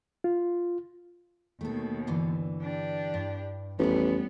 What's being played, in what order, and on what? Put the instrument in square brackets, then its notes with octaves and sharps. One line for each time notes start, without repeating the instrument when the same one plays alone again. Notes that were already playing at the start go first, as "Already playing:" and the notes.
[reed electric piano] F4
[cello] D#2 B2 [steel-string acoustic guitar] A3 A4
[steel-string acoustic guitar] G2 D3 E3
[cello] D4 G4
[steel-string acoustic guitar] G2
[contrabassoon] A1 [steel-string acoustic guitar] F2 G#4 A4 [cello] G3 B3